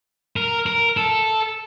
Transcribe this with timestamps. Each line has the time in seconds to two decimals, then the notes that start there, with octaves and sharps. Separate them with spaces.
0.36 A#4
0.66 A#4
0.97 A4